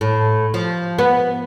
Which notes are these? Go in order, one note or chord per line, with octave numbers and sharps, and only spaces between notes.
A2
F3
B3